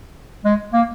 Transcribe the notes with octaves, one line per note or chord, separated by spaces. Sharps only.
G#3
A#3